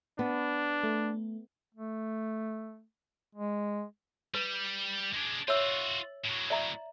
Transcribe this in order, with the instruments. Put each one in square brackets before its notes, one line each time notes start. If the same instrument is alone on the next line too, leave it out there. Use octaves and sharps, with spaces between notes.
[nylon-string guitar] B3 [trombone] D4
[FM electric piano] A3
[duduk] A3
G#3
[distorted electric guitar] G3 [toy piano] B4
[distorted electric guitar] G#3 D4
[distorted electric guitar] F4 F#4 [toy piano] C#5 E5 E6
[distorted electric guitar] A2 F#3
[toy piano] D5 E5 A#5